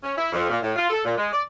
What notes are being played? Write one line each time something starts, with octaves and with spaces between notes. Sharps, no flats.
C#4
E4
F2
A#2
A2
F4
A4
A#2
G#3
D5